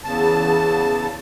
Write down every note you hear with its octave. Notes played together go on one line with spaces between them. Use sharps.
E2 C#3 A5